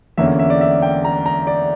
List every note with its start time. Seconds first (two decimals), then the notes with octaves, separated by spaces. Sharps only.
0.18 E2 D3 A#3 C#4 E5
0.39 E5
0.50 D5
0.61 E5
0.82 G5
1.05 A#5
1.26 A#5
1.47 D5